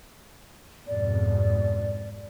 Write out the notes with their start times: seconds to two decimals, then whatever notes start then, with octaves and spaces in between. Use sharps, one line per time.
0.87 F2 G#2 B2 D5